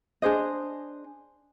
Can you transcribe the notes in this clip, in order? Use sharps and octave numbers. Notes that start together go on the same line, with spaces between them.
D4 G#4 C5 D#5